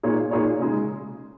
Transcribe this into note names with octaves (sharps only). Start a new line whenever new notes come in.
A#2 A#3 D#4 G#4 C#5
A#2 A#3 D#4 G#4 C#5
C#3 G#3 D#4 G#4